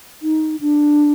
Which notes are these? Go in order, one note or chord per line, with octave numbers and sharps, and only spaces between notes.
D#4
D4